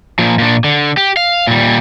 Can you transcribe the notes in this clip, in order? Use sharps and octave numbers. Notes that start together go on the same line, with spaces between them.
A#2 F3
A#2 D4
D3
G4
F5
A#2 G3